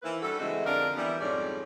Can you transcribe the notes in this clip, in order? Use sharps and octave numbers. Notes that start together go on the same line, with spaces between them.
D#3 E3 A#3 E4 B4 C5
G2 G3 F#4 A4
C#3 E3 G#3 A3 C4 F#4
F2 D3 D4 A#4 D5 F5
E3 G3 B3
F2 G#2 D3 G3 C#5 D5